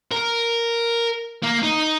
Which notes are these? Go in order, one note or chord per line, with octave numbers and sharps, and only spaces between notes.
A#4
A#3
D#4